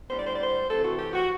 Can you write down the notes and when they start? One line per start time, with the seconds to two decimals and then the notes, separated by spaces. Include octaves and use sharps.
0.10 A2 G3 B3 D4 C5
0.19 D5
0.27 C5
0.35 D5
0.44 C5
0.69 C3 E3 A3 C4 A4
0.85 F#4
0.99 G4
1.13 F#4